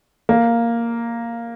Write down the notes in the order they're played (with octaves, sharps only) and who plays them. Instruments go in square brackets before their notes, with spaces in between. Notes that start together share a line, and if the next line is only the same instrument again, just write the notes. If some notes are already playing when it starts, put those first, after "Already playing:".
[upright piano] A#3